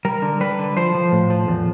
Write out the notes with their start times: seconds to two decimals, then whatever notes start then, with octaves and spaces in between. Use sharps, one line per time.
0.05 G3 A#4
0.22 D3
0.41 G3 B4
0.59 D3
0.77 F3 C5
0.95 F3
1.12 A2
1.30 F3
1.48 E2